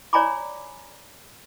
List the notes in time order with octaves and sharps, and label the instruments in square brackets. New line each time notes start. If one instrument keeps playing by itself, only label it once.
[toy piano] C#5 D5 G#5 A#5 B5 D6